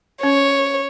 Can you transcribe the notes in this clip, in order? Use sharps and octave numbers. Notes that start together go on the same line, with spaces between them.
C#4 C#5